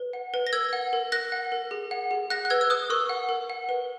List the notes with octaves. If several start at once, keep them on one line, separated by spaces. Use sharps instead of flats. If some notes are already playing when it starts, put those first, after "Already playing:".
Already playing: B4
F#5
B4
A#6
A#4 E6 G#6
F#5
A#4
A#4 F#6 A#6
F#5
A#4
G#4
F#5
G#4
F#5 F#6 A#6
F#6
B4 E6 G#6
E6
B4 D#6 F#6
A#4 C#6 E6
F#5
A#4
F#5
B4